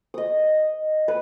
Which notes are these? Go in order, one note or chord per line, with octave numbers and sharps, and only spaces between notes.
D#5 D#6
B4